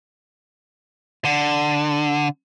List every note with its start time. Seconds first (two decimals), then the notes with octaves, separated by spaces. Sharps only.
1.25 D3